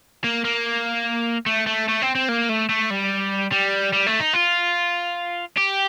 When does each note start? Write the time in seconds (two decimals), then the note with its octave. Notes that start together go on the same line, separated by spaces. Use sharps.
0.24 A#3
0.45 A#3
1.46 A3
1.67 A3
1.88 A3
2.02 C4
2.15 C4
2.29 A#3
2.49 A3
2.69 A3
2.90 G3
3.52 G3
3.93 G3
4.06 A3
4.20 D#4
4.34 F4
5.57 G4